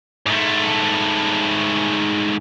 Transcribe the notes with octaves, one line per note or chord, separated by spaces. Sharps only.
G#2 A3